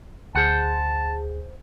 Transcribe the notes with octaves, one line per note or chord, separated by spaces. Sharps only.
D2 G#4 C5 F#5 A5